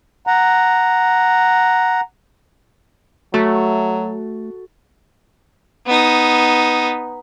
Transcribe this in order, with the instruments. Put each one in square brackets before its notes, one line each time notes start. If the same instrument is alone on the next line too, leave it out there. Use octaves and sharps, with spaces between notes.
[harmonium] F#5 A#5
[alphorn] F#3 [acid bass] A3 [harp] F#4 A4
[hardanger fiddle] B3 D#4